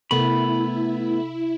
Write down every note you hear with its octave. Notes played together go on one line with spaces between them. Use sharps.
C3 A3 B3 E4 B5